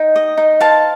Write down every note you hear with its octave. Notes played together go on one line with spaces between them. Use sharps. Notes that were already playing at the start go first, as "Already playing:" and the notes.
Already playing: D#4 G5
D#5
D#4
C5 F5 A5